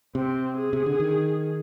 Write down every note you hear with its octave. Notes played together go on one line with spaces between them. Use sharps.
C3 C4
G#4
C3
D3
D#3